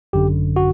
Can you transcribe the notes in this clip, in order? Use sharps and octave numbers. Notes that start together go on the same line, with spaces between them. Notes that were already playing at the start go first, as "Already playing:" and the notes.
G#1 F#2 D3 G4
F#4